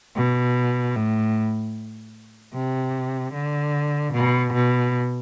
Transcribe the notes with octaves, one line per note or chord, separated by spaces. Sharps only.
B2
A2
C3
D3
B2
B2